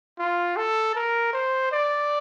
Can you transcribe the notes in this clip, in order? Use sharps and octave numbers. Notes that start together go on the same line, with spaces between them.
F4
A4
A#4
C5
D5